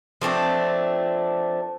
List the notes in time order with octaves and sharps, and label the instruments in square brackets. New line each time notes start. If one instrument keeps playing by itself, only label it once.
[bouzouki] F3 A3 C4 D4